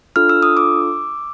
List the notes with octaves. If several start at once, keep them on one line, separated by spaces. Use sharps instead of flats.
D4 F4 A4 F6
E6
D#6
D6 E6